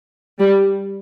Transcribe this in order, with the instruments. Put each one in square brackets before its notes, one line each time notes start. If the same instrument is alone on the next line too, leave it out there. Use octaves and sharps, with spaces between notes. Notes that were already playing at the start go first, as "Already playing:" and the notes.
[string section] G3